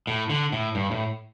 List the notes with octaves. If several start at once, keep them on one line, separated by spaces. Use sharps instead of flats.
A2
D3
A2
G2
A2